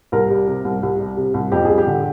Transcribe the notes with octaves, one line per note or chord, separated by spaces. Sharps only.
C2 A#4
G3
C3
C2
C2
G3
C3
C2
F2 G4
G3 G#4
G4
D3